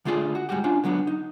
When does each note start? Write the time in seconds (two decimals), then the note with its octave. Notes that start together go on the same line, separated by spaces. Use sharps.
0.05 D3 A3 F4 G#4 D5
0.35 F#4
0.49 G#2 G3 F#4 G4
0.64 C#4 D4 F4
0.84 D3 F#3 B3 D4
1.07 D#4